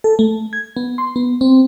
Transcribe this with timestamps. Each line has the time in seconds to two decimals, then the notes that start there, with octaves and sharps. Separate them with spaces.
0.04 A4
0.19 A3
0.53 G#6
0.77 B3
0.98 C6
1.16 B3
1.41 C4